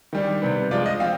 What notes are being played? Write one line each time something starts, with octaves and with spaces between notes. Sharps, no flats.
D#3 G3 D4
C3 G3 B3
F3 G#3 D4 F4 D5
D#5
F3 C4 F5